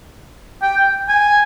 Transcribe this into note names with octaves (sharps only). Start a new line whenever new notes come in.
G5
G#5